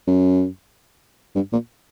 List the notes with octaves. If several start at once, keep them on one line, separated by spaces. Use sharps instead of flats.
F#2
G2
A#2